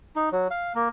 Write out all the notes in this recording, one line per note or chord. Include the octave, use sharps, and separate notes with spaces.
D#4
F#3
F5
A#3